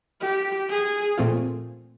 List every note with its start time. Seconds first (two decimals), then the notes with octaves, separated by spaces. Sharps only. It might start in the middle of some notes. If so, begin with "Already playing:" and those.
0.21 G4
0.69 G#4
1.18 A#2 F3 A3 C4 F4